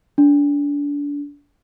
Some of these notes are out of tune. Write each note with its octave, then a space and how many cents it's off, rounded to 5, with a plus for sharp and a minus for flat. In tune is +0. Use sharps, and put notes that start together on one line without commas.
D4 -30